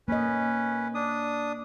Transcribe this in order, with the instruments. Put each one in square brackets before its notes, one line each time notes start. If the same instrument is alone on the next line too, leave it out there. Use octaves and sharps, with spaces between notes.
[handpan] A#3 D#5 [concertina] C#4 B4
[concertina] D4 D#6